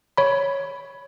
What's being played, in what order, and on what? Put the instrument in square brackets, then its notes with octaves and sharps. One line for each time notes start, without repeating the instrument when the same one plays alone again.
[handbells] C#5 B5